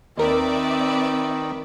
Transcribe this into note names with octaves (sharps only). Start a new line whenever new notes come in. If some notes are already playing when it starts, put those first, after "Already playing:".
D#2 D#3 C4 A#4 B4 D5 E5